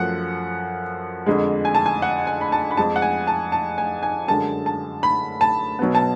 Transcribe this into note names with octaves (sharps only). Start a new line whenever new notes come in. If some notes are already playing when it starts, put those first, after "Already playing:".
Already playing: F#2 F3 A3 F#5
F2 D3 G#3
G#5
A5
G#5
F#5
G#5
B5
A5
B5
F2 F3 G#3 A5
F#5
G#5
A5
A5
G#5
G#5
F#2 D3 G#3 A5
A5
B5
A5
B2 F#3 B3
A5